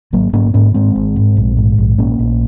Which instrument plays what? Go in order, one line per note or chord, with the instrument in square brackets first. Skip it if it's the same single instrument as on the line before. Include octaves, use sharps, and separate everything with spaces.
[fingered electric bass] G#1 F#3 A#3
G#2 A#3 C#4
G#2 A#3 C#4
G#2 G#3 C4
G#1
G#2
A#1
G#2
A#1
A#1 A#3 C#4
A#1